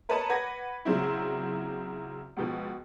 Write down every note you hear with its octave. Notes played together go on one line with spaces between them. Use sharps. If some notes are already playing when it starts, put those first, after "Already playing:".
A#4 B4 C#5 D#5 A5 A#5
B4 F#5 D6 G#6 A#6
A#2 C#3 F#3 C4 E4
C#2 B2 F3